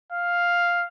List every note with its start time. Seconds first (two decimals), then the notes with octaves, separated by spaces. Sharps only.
0.12 F5